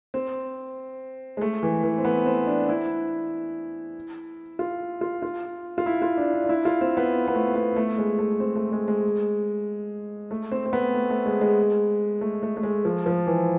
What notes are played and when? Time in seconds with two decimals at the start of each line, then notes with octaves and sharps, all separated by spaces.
0.14 C4
1.37 G#3
1.41 A3
1.63 E3
1.84 E3
1.98 C4
2.05 B3
2.26 C4
2.47 D4
2.69 E4
4.59 F4
5.01 F4
5.22 F4
5.78 F4
5.86 E4
6.02 F4
6.17 D4
6.34 D4
6.44 D4
6.49 E4
6.65 F4
6.81 C4
6.97 B3
7.28 B3
7.35 A3
7.55 B3
7.76 A3
7.98 G#3
8.19 A3
8.40 C4
8.56 A3
8.72 G#3
8.88 G#3
10.31 A3
10.52 C4
10.66 C4
10.73 B3
10.94 A3
11.10 A3
11.26 G#3
11.41 G#3
12.21 A3
12.43 A3
12.57 A3
12.63 G#3
12.85 F3
13.06 F3
13.27 E3